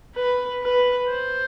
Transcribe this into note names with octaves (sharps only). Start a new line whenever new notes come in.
B4
B4
C5